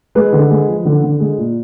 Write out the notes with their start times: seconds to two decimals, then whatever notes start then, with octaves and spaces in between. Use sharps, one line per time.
0.15 G#3 B4
0.33 D3
0.50 G#3
0.68 F3
0.85 D3
1.03 D3
1.20 G#3
1.38 A#2